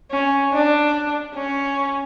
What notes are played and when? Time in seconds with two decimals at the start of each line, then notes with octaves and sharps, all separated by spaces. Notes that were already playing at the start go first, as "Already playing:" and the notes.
0.11 C#4
0.52 D4
1.34 C#4